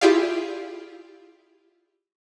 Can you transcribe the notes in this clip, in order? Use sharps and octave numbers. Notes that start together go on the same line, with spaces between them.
E4 F4 G4 G#4 D5 F5